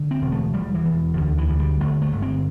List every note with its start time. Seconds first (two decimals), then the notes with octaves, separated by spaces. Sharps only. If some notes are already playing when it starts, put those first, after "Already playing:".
Already playing: D3
0.11 C4
0.22 E1
0.32 A3
0.53 E1 G3
0.74 E3
0.85 E2
1.17 D2 D3
1.38 E3
1.49 D3
1.60 G3
1.80 G1 A3
2.02 A3
2.12 G1
2.22 C4